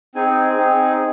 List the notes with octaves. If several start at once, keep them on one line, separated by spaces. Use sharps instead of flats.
C4 D#4 G#4 G#5
C4 D#4 G#4